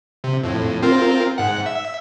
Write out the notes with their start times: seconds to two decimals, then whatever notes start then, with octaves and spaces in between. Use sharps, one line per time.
0.24 C3
0.43 F2 A2
0.82 C4 F4 A#4
1.38 G#2 F#5
1.66 E5